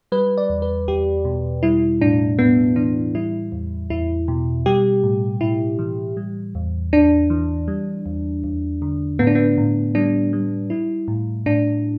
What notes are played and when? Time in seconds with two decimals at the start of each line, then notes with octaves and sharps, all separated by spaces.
0.12 G3 B4
0.38 D5
0.50 E2
0.62 B4
0.88 E2 G4
1.25 B2
1.63 G3 E4
2.01 A2 D4
2.39 A2 B3
2.76 E3 D4
3.15 G3 E4
3.52 E2
3.90 E2 E4
4.28 B2
4.66 G3 G4
5.03 A2
5.41 A2 E4
5.79 E3
6.17 G3
6.55 E2
6.93 E2 D4
7.30 E3
7.68 G3
8.06 E2
8.44 E2
8.82 D3
9.19 A2 B3
9.27 D4
9.35 B3
9.58 A2
9.95 G3 D4
10.33 G3
10.70 G3 E4
11.08 A2
11.46 A2 D4